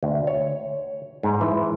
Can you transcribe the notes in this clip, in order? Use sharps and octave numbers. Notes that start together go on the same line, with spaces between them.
D2
C#5
G#2
E3